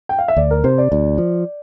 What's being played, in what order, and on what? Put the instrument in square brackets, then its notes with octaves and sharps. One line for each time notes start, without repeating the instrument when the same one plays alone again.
[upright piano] G5
F5
E5
[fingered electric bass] D2 [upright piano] D5
[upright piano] A#4
[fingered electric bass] C3 [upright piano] C5
[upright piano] D5
[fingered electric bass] D2 [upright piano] D5
[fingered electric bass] F3